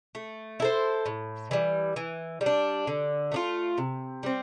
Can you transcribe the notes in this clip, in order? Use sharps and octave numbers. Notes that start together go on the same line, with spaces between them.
A3
E4 A4 C5
A2
E3 G3
E3
G3
D4
D3
A3 D4 F4
C3
G3 C4